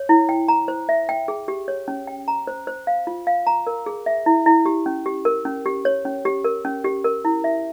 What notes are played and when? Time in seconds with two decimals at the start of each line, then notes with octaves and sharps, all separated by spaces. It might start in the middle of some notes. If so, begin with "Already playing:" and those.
Already playing: C#5
0.09 E4
0.29 G5
0.48 A#5
0.68 C5
0.89 E5
1.09 G5
1.28 G#4
1.48 G4
1.68 C#5
1.88 C#4
2.07 G5
2.28 A#5
2.47 C5
2.67 C5
2.87 F5
3.07 F4
3.27 F5
3.47 A#5
3.67 A#4
3.86 G#4
4.06 E5
4.26 E4
4.46 E4
4.66 G4
4.86 C#4
5.06 G4
5.25 A#4
5.45 C#4
5.66 G4
5.85 C#5
6.05 C#4
6.25 G4
6.44 A#4
6.65 C#4
6.84 G4
7.05 A#4
7.25 E4
7.44 E5